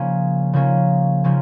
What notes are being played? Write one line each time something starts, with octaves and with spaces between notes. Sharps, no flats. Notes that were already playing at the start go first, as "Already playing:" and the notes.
Already playing: C#3 F3 A#3 C#4
C#3 F3 A#3 C#4
C#3 F3 A#3 C#4